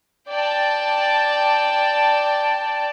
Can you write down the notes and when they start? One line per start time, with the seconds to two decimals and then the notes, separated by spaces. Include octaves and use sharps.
0.29 D5 G5 A5